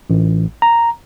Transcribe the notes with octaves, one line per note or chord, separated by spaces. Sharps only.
A1
A#5